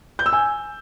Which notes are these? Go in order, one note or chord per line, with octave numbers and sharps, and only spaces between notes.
G6
E6
G#5